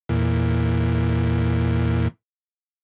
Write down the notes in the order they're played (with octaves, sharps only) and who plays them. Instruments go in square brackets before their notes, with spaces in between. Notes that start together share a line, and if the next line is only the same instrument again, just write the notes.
[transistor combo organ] E2 A#2